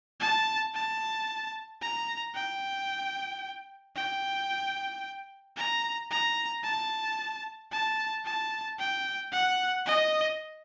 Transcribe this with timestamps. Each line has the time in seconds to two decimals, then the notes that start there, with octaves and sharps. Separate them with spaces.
0.20 A5
0.74 A5
1.82 A#5
2.35 G5
3.96 G5
5.56 A#5
6.11 A#5
6.63 A5
7.72 A5
8.25 A5
8.79 G5
9.32 F#5
9.85 D#5